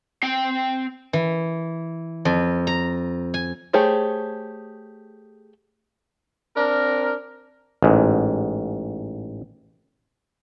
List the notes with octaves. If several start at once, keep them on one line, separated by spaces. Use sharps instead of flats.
C4 G5
E3
F2
A#5
G#5
A3 G4 G#4 C5 C#5
C4 D4 A#4
A1 G#2